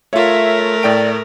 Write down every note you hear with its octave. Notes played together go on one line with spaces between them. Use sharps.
A3 F4 A#4 C#5 E5
A2 D5 G5 D7